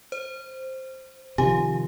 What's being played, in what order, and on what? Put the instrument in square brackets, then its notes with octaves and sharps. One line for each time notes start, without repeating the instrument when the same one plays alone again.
[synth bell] C5
[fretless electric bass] C3 D#3 F3 [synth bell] G4 [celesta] G#5